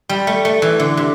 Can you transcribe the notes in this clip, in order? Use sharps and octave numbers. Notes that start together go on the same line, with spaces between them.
G3
A3
A3
E3
D3
C3